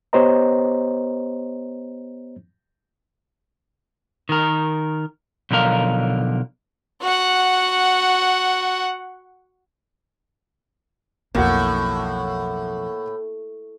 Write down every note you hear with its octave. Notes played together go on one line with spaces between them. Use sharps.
B3 G4 C5 C#5 D#5 A#5
D#3 A#4
B1 D3 F3 A#4 F5
F#4 F#5
B1 F2 A2 A#3 F#4